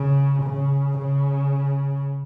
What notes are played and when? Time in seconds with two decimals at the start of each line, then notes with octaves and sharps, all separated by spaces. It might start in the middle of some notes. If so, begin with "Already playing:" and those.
Already playing: C#3
0.42 C#3
0.99 C#3